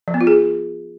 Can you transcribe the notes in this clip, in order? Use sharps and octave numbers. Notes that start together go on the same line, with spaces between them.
F3
B3
F4
G#4